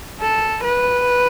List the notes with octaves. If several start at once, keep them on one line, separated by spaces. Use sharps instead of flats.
A4
B4